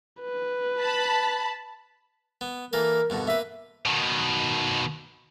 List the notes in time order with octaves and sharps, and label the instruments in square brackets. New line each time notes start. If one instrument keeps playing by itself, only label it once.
[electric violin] B4
[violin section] A5 B5
[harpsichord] B3
[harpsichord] E3 A#3 A4 [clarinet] A#4
[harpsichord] G2 B2 D3
[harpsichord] A#3 B4 [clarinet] E5
[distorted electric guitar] B2 D#3